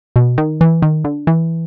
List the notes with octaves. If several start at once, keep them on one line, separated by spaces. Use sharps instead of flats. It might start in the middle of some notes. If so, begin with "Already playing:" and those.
B2
D#3
E3
D#3
D3
E3